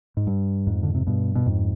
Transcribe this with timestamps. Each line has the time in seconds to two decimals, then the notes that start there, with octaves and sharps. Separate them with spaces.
0.17 G#2
0.27 G2
0.67 F2 G#2
0.83 D3
0.95 C3
1.07 G2 B2
1.35 B2
1.46 F2 G#2